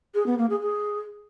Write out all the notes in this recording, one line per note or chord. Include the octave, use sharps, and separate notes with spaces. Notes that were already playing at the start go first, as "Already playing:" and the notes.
G#4
B3
A#3
G#4
G#4